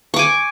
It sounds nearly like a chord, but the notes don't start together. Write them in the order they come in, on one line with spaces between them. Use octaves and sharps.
C#6 D6 G#5